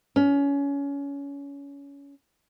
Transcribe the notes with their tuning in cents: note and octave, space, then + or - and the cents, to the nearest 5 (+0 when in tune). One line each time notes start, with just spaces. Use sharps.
C#4 +25